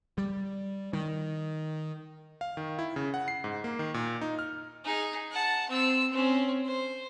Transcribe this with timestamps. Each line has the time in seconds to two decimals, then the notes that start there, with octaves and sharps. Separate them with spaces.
0.18 G3
0.93 D#3
2.41 F5
2.57 D#3
2.79 E4
2.96 C#3
3.14 F#5
3.28 C7
3.44 G#2
3.64 A#3
3.79 D#3
3.94 A#2
4.21 D#4
4.39 F6
4.85 D#4 G#4
5.32 F#5 A5
5.69 C4 E6
6.12 C4 C#4
6.65 C5